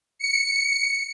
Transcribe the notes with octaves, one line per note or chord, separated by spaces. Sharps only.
C#7